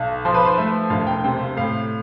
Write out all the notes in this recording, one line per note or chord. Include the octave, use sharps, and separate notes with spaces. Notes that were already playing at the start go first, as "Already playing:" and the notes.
Already playing: B1
F3 C5
B4
C5
A3 E5
E1 F5
G5
C3 G5
F5
A2 F5